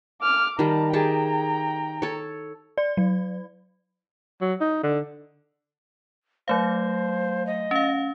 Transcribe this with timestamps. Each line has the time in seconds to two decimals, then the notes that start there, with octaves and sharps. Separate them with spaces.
0.22 D6 F6
0.59 D#3 G3 A5 A#5
0.93 G4 G#4 G5 A5 A#5
2.02 A4 C#5
2.78 D5
2.97 F#3
4.41 F#3
4.61 D#4
4.83 D3
6.48 F#3 A3 C5 F5
7.47 D#5
7.71 C#4 F5